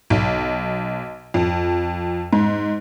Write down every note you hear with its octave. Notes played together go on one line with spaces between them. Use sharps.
B1
F2
G#2